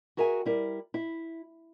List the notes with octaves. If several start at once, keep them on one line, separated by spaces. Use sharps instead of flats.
F#4 G#4 A#4 E5 F#5 G#5
G3 E4 A#4
E4